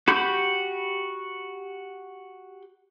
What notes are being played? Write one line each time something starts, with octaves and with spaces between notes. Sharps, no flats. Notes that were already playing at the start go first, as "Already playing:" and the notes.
F#4 G4 B5 G6